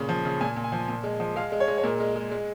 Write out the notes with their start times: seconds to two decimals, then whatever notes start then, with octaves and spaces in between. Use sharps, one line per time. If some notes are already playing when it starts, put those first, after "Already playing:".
Already playing: A#2 C#3
0.09 F3
0.25 C#3
0.41 A#2 G#5
0.56 A#2
0.64 G#5
0.72 F3
0.88 A#2
1.04 G#3
1.20 F3
1.36 G#3 F5
1.52 G#3
1.60 C#5
1.68 G#3
1.78 C#5
1.83 A#2 A#4
2.00 G#3
2.16 G#3
2.31 G#3